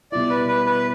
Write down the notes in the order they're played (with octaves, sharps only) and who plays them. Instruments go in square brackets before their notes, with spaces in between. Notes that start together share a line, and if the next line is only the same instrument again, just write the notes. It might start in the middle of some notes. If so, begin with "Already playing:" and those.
[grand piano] B2 G3 E4 [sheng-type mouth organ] D5
[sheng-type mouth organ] B4
B4
B4